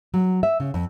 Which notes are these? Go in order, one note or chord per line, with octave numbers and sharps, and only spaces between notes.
F#3
E5
C#3
F2